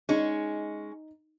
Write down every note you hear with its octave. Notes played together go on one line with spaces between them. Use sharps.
G#3 C#4 D#4